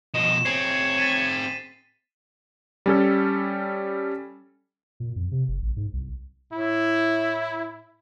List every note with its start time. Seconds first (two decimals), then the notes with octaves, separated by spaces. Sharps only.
0.14 B2 F3 D#5 E7
0.45 C4 G#4 C#5 C7
0.98 A6 B6 D#7
2.86 G3 C#4 A4
5.00 A#2
5.16 F2
5.32 C3
5.48 F#1
5.62 A1
5.77 G#2
5.93 C2
6.53 A2 E4